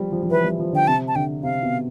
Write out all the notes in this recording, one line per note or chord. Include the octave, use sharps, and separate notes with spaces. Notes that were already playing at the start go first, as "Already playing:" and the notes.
Already playing: F3 G3
F3
F3
E3 B4
G3
F3
D3 G5
C3 A5
A5
D3 G5
C3 F5
B2